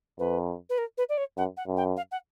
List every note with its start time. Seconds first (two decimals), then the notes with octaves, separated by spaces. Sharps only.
0.19 F2 B4
0.69 B4
0.78 A#4
0.97 B4
1.09 D5
1.17 C#5
1.37 F#2 F#5
1.57 F#5
1.67 F#2
1.77 G5
1.97 F5
2.11 F#5